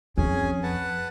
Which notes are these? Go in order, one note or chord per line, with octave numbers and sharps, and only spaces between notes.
F2 C#4 G#4 G#5
B4 F#5 A5